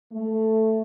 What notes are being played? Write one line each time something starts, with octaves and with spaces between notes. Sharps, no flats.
A3